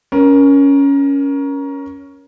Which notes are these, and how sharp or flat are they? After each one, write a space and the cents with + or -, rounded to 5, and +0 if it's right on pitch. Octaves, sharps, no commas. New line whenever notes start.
C#4 +10 A#4 +20